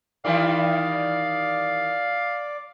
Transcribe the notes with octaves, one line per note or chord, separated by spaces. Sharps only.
D#3 E3 G3 D5 F5